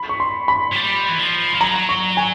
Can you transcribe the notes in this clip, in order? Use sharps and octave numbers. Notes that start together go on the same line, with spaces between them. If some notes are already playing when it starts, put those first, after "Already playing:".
Already playing: B5
C#6
C6
B5
F#3
G3
E3
F3
F3
F#3 A#5
C#6
G#5